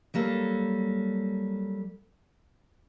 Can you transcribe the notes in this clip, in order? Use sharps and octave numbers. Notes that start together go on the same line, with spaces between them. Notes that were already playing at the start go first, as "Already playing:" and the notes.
F#3 G3 A#3 A4